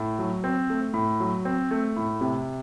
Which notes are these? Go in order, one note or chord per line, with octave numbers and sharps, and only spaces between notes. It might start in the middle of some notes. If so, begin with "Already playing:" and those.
Already playing: A2
F#3
C4
A3
A2
F#3
C4
A3
A2
C3